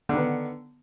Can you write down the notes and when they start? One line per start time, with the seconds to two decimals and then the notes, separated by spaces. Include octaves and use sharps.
0.09 D3
0.13 D#3
0.17 B3